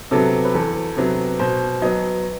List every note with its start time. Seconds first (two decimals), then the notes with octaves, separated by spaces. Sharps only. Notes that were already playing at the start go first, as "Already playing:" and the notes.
0.11 C3 F#3 B3 A4
0.45 B4
0.54 E2 A4
0.97 C3 F#3 B3
1.39 B2 C5
1.82 F#3 B3 D#5